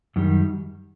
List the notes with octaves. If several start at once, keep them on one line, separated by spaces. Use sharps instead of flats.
F#2 D#3 G3